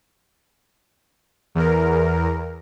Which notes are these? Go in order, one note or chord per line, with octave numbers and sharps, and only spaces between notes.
E2 A#4